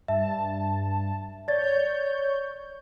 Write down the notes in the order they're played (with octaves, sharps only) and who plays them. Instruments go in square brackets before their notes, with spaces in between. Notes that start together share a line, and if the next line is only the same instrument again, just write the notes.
[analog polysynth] G2 A5 [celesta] E5
[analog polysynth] C#5 G6 [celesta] D5 A6